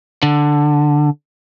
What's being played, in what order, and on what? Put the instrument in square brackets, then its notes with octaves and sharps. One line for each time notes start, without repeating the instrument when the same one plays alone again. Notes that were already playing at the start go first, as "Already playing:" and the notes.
[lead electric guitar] D3